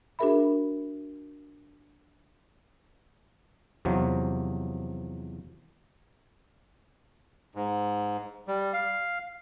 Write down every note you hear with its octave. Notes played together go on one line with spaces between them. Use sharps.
D4 F#4 G#4 A#4 E5 B5
E2 C3 F3 F#3
G#2
G3
F5